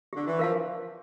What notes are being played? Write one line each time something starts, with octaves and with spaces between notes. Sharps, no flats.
D3 G4
E3
F3 A#4 F5 A5